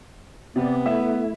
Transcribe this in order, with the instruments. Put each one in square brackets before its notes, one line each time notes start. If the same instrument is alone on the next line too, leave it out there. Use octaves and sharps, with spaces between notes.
[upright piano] C3 [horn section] B3 [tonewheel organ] D5
[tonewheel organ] A3 E4 [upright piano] E5